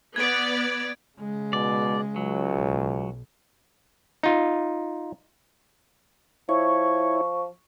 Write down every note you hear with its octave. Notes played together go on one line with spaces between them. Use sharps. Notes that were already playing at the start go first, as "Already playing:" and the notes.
B3 D5 G#6 D7
C#3 G#3
B2 D5
C#2 F#3
B1
D#4 F4
F3 E4 C#5 C#6